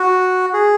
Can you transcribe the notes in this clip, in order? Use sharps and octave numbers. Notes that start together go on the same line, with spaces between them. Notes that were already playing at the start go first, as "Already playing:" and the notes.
Already playing: F#4
G#4